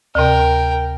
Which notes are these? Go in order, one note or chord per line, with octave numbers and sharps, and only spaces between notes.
D2 C3 A#4 G5